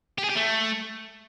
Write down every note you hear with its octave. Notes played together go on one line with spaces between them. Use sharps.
G4
G#4
G4
A3